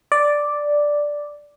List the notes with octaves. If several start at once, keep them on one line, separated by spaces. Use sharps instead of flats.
D5